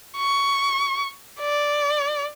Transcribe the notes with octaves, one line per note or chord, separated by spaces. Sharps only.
C#6
D5